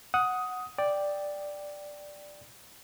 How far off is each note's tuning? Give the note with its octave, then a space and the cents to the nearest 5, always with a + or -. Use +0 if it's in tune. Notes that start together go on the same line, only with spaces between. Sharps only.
F#5 -5 D#6 +10
D5 +0 G5 +0